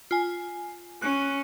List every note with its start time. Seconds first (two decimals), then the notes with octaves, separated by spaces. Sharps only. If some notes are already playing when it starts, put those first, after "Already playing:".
0.11 F4 G#5
1.02 C#4 F#6